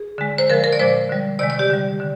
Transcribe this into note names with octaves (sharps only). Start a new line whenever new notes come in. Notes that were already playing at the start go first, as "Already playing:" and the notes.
Already playing: G#4
D3 G#3
C5
D3 F3 G#3 A#4
A#4
D5
A#2 F3 G#3 C5
D3 G3
C3 D#3 G#3 D5
D5
G4
D3 G3
D3